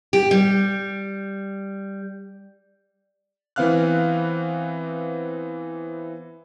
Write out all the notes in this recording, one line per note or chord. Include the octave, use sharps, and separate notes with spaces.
G4
G3
E3 B3 C4 F5 F6 F#6